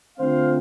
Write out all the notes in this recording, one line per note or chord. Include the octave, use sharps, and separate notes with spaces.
D3 A3 C4 F4 C5 F5